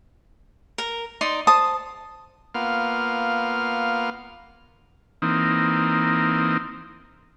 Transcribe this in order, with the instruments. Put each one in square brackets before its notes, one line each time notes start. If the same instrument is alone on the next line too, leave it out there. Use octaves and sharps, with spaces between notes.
[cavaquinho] A#4
D#4 D5 C6
C5 A5 D#6
[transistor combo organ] A#3 B3 F4 F6
E3 A#3 C4 D#4